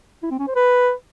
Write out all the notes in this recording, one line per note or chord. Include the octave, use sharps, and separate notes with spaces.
E4
C4
C#4
C5
B4